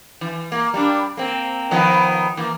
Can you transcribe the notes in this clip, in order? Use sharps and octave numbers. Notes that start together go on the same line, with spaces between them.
E3
A#3
G3 D4
A#3 C4
D#3 F3 B3
E3 A#3